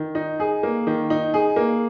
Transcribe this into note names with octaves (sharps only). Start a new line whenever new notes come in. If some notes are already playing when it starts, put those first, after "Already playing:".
Already playing: D#3
D#4
G#4
A#3
D#3
D#4
G#4
A#3